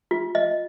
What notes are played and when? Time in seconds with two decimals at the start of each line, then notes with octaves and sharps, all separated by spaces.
0.11 F4
0.35 D#5